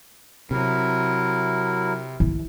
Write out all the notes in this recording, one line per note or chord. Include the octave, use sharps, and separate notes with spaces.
C3 F#3 E4 A#4
E3